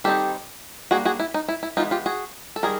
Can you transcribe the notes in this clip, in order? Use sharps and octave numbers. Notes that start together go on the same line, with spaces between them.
D#3 G3 C4 D#4 G4 A4
G3 A#3 D4 F#4 G#4
F#4 G#4
E4
D#4
E4
E4
E3 G#3 B3 D#4 F4
F4 G4
F#4 G#4
A4
D#3 G3 G#4 A#4